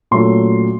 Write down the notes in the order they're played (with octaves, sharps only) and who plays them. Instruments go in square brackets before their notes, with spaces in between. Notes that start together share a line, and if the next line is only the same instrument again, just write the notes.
[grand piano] A#2 F#3 A3 C#4 C6